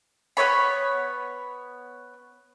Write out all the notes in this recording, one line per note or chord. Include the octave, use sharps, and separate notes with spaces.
B3 C#4 C#5 B5